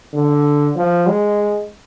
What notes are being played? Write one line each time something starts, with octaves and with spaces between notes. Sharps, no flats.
D3
F3
G#3